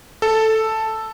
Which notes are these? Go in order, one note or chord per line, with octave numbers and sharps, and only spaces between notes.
A4